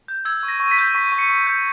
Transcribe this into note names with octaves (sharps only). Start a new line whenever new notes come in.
G6
E6 G#6
C#6
A#6
C#6
B6
G6
C#6 B6
C#6
C#7
C#6
C#7
G6